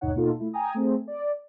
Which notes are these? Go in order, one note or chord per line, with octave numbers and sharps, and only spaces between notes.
G1 D#2 B2 D#4 C#5 F#5
B2 A#3 D#4 F4 A4
A3 E4
G5 G#5 A#5 D#6
A3 C4 G#4
D5